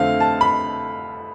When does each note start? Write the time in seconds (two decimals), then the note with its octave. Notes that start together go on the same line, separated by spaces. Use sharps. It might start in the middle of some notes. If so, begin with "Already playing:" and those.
Already playing: F2 D3 A3 C4 F5
0.20 A5
0.41 B5